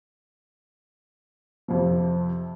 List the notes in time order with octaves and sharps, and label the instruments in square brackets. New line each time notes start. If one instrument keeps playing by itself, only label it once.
[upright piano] F2 C3 F3